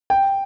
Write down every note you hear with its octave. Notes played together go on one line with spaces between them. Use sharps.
G5